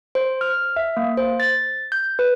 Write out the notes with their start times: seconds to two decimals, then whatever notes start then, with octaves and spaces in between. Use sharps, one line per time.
0.15 C5
0.41 F6
0.76 E5
0.97 A#3
1.17 C5
1.40 A6
1.92 G6
2.19 B4